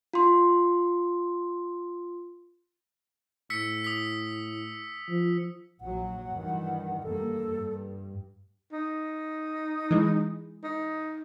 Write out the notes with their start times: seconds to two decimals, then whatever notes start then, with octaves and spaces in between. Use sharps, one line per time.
0.14 F4 C6
3.50 A2 E6 B6 C#7
3.84 D#6 B6
5.09 F3
5.81 A#1 F#3 F#5
6.34 G2 D#3 E3
7.03 G2 A#3 A4
7.57 G2
8.72 D#4
9.91 E3 G#3
10.63 D#4